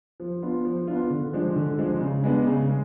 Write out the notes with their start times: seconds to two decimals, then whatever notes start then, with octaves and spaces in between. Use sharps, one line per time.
0.20 F3
0.42 B3 D4 F4
0.65 F3
0.87 B3 D4 F4
1.10 D3
1.33 F3 G#3 D4
1.56 D3
1.78 F3 G#3 D4
2.01 C#3
2.24 G#3 B3 D4
2.46 C#3
2.69 G#3